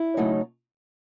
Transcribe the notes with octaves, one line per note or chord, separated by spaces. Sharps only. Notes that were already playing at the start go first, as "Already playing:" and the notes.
Already playing: E4
C#3 F#3 A3 D#4